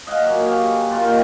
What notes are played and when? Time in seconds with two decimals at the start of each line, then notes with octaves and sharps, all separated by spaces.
0.07 D#5 F5 F#5 G#5
0.22 F#3 A#3
0.46 G4 G#5
0.65 D3
0.91 A#2 F4
1.06 D#3 G5 C#6